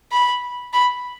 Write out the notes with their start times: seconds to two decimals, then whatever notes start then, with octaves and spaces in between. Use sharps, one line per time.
0.12 B5
0.73 B5